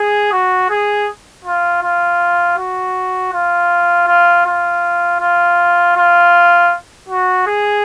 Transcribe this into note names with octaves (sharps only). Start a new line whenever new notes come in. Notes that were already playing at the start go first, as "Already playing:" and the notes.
Already playing: G#4
F#4
G#4
F4
F4
F#4
F4
F4
F4
F4
F4
F#4
G#4